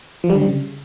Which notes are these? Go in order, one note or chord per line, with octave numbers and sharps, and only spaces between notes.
F3
G3
D3
G3
C#3